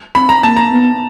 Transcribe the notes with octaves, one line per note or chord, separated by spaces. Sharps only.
C4 B5
A#5
A#3 A5
A#5
B3